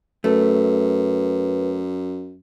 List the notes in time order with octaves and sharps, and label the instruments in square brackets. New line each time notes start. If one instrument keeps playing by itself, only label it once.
[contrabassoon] F#2 [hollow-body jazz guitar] A3 [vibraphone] B4